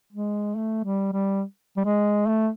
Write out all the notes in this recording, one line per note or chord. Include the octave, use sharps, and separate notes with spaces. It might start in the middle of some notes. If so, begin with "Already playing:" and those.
G#3
A3
G3
G3
G3
G#3
A3